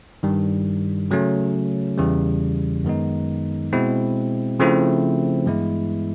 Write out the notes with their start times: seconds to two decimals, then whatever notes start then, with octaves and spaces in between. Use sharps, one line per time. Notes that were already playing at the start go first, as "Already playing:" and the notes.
0.23 G2 D#3 G3
1.11 C#3 F#3 A3 C#4
1.98 E2 C#3 E3 G3
2.84 F#2 D#3 G#3 B3 D#4
3.73 B2 G#3 C4 E4
4.60 C#3 F3 A3 C4 E4
5.46 G2 E3 G#3 B3 E4